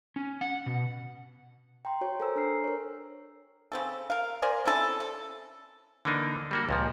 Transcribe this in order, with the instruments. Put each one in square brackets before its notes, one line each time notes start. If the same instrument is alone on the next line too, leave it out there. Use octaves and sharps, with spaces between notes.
[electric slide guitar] C#4
F#5
B2
[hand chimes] G5 A#5 C6
F#4 C#5 C6
A4 A#4 C5 G#5 A#5 E6
D4 A#5 F6 C7
A#4 C#5
[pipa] C#3 C4 A4
A#4 F5
A#4 C5 D5 G#5
C4 C#4 E4 A4
A4
[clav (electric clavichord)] D3 E3 A#3 D4 D#4
G3 A#3 F#4
C#2 A#2 F3